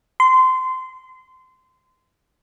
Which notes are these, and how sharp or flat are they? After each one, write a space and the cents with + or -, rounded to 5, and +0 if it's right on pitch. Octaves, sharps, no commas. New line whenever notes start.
C6 -20